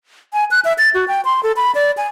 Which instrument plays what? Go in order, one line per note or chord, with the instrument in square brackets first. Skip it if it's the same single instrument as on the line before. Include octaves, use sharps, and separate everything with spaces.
[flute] G#5
F#6
E5
A6
F#4
G5
C6
A4
B5
D5
G#5